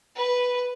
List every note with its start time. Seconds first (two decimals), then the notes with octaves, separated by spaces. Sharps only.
0.16 B4